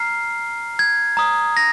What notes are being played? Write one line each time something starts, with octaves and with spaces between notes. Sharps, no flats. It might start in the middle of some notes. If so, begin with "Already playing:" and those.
Already playing: A#5 F6 C7
G#6
A#5 D#6
A#6